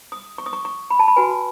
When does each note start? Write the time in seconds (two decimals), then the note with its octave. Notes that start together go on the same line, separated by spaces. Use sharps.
0.12 D#6
0.38 C#6
0.46 D#6
0.53 C#6
0.65 C#6
0.90 B5
0.99 A5
1.08 B5
1.16 F#4 B4 G#5